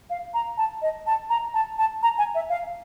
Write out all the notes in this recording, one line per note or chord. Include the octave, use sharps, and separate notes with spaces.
F5
A#5
A5
D#5
A5
A#5
A5
A5
A#5
G#5
E5
F5